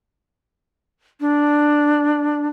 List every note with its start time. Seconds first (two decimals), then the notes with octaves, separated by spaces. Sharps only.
1.20 D4